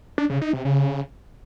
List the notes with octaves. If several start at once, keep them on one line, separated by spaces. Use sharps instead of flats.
D4
C#3
D#4
C3
C#3